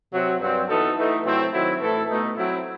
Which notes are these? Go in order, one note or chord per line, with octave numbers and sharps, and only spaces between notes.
C3 F#3 C4 F#4
G2 F#3 C4
E3 B3 D#4 F#4 A4
E3 A3 D#4
C3 F#3 A3 C4 E4
D#3 F#3 C4 E4
A2 E3 A3 E4 A4
B2 A3 D#4
F#3 C4 E4